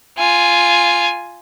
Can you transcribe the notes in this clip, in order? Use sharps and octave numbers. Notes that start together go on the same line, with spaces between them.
F4 G#5